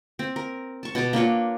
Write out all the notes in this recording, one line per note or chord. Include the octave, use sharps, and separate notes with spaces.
C4
A#4
A5 C#6
B2 A5 D6
A#3 D4 F4 C#5